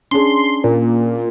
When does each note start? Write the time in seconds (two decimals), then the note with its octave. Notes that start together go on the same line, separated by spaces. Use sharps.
0.11 C#4 D4 G#4 C6
0.64 A#2